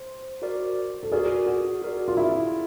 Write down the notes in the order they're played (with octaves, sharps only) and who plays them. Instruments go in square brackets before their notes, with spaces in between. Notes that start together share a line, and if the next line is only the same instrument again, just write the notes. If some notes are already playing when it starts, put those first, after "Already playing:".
Already playing: [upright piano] C5
[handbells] F#4 A#4 D5
[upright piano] A4
[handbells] F#4 A#4 D5 [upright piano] G#4
[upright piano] F#4
[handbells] F#4 A#4 D5
[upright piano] F4
E4